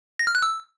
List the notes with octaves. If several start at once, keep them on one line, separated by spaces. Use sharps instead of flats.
A#6
F6
F#6
E6